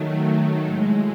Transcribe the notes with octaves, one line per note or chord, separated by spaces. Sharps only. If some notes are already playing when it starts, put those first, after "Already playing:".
Already playing: D#3 F#3 A3
A2 G#3